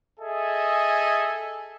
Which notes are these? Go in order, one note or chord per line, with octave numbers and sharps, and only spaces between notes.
G#4 A4 D#5 E5 G#5